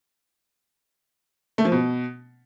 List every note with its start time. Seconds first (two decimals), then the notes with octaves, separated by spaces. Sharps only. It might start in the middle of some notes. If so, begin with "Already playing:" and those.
1.58 A3
1.65 F3
1.72 B2